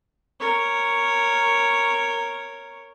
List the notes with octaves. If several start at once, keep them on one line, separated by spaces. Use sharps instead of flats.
A#4 C#5